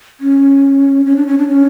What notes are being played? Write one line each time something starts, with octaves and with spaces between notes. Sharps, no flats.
C#4
C#4
D4
C#4
D4
C#4